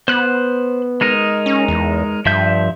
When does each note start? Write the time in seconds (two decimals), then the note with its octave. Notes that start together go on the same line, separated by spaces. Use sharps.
0.08 B3 C5 F#6
1.01 G#3 D#4 A#4
1.46 C#4
1.68 E2
2.26 G2 F3 E5 G6